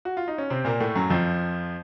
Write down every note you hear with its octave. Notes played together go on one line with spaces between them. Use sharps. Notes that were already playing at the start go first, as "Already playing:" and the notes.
F#4
F4
D#4
C#4
C3 C4
A#2 A#3
A2 A3
F#2 F#3
F2 F3